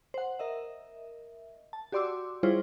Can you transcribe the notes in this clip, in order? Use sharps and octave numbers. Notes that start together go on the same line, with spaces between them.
C5 F#5
A#4 D#5 E5
A5
F#4 G4 D5 C6 D6 E6
G3 E4 F4 G#4 C5 C#5